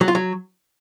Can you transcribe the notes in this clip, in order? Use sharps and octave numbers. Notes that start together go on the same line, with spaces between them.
F#3
F4
F#3